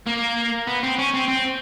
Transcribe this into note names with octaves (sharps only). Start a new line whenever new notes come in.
A#3
B3
C4
C#4
C4
C4